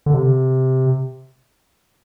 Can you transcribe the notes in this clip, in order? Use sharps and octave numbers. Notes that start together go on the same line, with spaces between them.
D3
C3